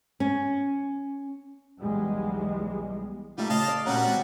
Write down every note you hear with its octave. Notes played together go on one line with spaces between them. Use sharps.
C#4
B1 E2 G3 G#3
G3 A3 D#4 F4
C#3 D#5 F5 A5
D5
A#2 G3 C#4 F#4 F#5 A#5
E3 G#3 C4